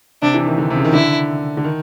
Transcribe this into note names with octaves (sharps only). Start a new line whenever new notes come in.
C3 D4
E3
D#3
D3
C3
C#3
D#3
D3 E4
D3
D#3